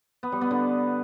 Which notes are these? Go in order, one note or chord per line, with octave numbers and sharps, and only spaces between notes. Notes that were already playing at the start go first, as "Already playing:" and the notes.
B3
G3
B3
D3